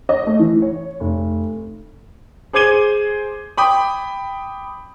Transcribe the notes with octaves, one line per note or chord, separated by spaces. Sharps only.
D#5
A3
E3
C#5
F1
G#4 C5 D6 G#6 D#7 G7
G5 B5 D6 D#6